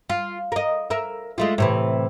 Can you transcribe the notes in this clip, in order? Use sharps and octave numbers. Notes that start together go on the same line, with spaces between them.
F4
A#4 D#5
A#4 E5
G#3 A3 F4
A2 C3 E3